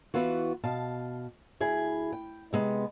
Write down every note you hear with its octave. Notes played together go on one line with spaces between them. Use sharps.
E3 B3 F4 F#4
B2 F5 A5
D2 E4 G#4 G#5
G5
C3 G#3 B3